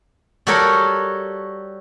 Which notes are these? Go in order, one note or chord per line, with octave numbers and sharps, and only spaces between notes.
G3 F#4 G4 A4 A#4 C#5